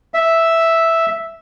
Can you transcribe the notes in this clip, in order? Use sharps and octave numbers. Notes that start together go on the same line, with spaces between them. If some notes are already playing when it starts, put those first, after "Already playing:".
E5